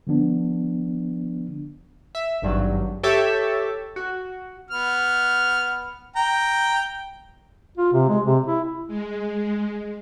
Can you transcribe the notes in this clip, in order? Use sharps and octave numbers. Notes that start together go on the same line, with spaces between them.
D3 F3 B3 D4
E5
G#1 G2 F#3
G4 A4 C#5 E5
F#4
B3 F6
G5 A#5
F4
C3
G#3
C3
E4
G#3